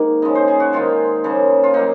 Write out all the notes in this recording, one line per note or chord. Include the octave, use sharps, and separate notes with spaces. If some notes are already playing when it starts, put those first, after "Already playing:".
Already playing: G#2 D#3 A#3
C#3 F3 G#3 D#5
C5
G#4
F#4
G#2 D#3 G#3 F4
C#3 F3 A#3
F4
A#2 F#3 A#3 D#4